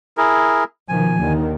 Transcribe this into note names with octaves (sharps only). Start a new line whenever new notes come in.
E4 G#4 A#4
B2 D#3 F3 G#5
D#2 D3 D#3